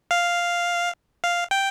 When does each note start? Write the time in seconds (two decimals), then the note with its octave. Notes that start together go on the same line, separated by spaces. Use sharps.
0.11 F5
1.24 F5
1.51 G5